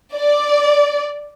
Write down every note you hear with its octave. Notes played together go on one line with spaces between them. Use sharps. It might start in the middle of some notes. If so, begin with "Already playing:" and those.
D5